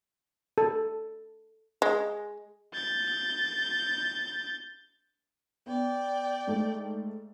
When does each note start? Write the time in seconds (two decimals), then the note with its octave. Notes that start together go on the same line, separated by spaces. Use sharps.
0.58 A4
1.82 G#3
2.74 G6 A6
5.66 B3 D5 G5
6.47 G#2 A3